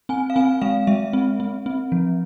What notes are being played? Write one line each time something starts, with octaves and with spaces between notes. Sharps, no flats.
C4 G#5
F5
C4 G#5
G#3 F5
G#3 E5
C4
C4
C4
F3